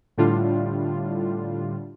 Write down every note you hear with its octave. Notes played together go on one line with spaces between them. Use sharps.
A2 D3 G3 D4 F4